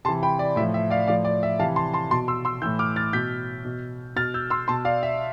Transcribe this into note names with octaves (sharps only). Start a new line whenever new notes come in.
C3 E3 A5 C6
G5 B5
D5
A2 F3 E5
E5
D5 F5
A2 F3 D5 F5
D5
E5
C3 E3 F5 A5
A5 C6
A5 C6
B2 A5 C6
C6 E6
C6 E6
A2 E3 E6 G6
D6 F6
F6 A6
B2 G6 B6
B2
B2 F6 A6
E6 G6
C6 E6
B2 A5 C6
D5 F5
E5